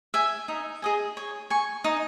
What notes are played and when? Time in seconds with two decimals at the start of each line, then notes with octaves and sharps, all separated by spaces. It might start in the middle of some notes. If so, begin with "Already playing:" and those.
0.14 E5 G#5
0.48 D#4
0.82 G#4 D#5 G#5
1.17 C#5
1.50 G#5 C#6
1.84 D#4